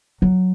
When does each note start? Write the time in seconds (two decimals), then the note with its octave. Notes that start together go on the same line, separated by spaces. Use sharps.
0.22 F#3